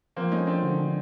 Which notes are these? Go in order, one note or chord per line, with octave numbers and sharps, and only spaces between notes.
F3 A#3 C4
A3 C#4 D#4
F3 C4 D4
D3
D3